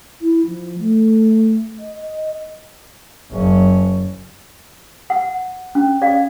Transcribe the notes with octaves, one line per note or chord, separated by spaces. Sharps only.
E4
F3
A3
D#5
F#1 C#4
F#5
C#4
D5 F5